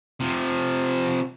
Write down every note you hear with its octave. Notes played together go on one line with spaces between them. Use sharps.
C3 F3